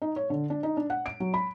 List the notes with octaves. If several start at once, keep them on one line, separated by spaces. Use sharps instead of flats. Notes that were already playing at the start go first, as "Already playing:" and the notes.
D#4
C#5
D3
D4
D#4
D4
F#5
D7
F#3
B5